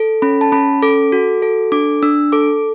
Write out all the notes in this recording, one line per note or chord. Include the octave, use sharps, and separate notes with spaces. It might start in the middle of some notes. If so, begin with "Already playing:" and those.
Already playing: A4
C#4 B5
A5
C#4 B5
A4 D6
F#4
A4
D4 D6
D4 E6
A4 D6